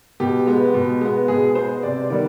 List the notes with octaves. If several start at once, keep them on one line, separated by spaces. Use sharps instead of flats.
B2 G4
G#3 B3
B2
G#3 B3
B2 G#4
G#3 B3 C5
C3 D5
D#3 G3 B3 D5